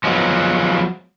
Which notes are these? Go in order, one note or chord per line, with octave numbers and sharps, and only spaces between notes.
F3 F#3 G#3 B3